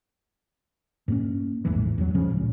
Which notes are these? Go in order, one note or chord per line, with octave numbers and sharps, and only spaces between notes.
G2 A#3 C#4
A1 E2 G#2 E3
E2 G2 F#3
G1 C#3 F3 C#4
C#2 A#2